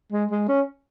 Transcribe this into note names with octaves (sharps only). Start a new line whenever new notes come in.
G#3
G#3
C#4